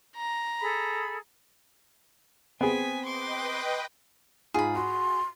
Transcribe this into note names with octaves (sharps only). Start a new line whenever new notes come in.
A#5
G#4 A4 B5
B3 C4 G#4 G#5 B6
B4 D#5 G5 C6 D6
G#2 F4 G#4 B5
F#4 C6